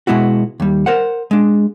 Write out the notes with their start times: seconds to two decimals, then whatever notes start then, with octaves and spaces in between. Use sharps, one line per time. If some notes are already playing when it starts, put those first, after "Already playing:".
0.07 B2 G#3 B3 E4 F#4
0.60 D#2 G3
0.86 A#4 C5 F#5
1.31 G#3 D4